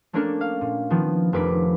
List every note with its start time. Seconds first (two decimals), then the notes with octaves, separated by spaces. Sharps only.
0.13 A3 A#3 C#4 D4 A4 A#4
0.41 F5
0.61 A#2
0.90 D#3 F3 B3
1.33 F1 A#4 B4 D6 B6